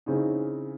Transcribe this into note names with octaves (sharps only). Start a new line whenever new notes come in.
C#3 E3 C4 D#4 G#4